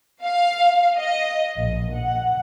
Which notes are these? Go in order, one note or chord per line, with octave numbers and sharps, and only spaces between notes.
F5
D#5
A#1
F#5